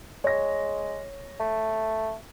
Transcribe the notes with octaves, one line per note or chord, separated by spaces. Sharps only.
G#3 C#5 A#6
A3